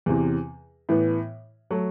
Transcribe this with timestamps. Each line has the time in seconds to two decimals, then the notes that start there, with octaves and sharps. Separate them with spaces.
0.06 E2 C3 E3
0.89 A2 E3 B3
1.71 F#3 A3